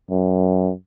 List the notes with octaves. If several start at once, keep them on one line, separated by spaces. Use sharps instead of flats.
F#2